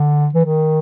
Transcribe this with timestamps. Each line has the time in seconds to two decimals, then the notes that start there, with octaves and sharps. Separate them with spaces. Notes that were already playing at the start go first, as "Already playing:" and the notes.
Already playing: D3
0.34 E3
0.45 D#3